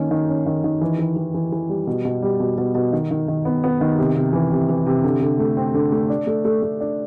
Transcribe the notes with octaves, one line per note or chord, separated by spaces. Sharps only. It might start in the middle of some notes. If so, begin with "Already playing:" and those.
Already playing: D#3 A#3 C#4
D#3
C#4
D#3
D#3
E3
E3
E3
E3
E3
G3
B2
B2
G3
B2
B2
B2
D#3
D#3
D#3
B3
B3
D#3
C3
C3
E3
C3
E3
C3
D3
D3
A3
C4
D3
A3
D4
A3
A3
A3
D4